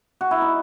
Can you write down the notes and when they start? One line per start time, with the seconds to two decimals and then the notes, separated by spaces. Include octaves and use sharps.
0.21 F#4
0.31 E4
0.42 D#4